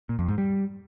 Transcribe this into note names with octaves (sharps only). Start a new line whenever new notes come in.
A#2
F2
G#2
G3